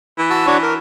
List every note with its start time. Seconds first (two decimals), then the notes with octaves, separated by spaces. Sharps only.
0.18 E3
0.30 F#4 A5 E6
0.46 D4 F#4 C#5
0.63 A#4